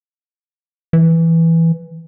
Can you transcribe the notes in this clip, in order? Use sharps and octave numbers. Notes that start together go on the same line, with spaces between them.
E3